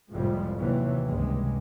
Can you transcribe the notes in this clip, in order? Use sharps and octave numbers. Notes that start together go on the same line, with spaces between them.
F1 F2 A2 F3 G3 G#3
D#2 C3 E3 F#3
C#2 G2 C3 G#3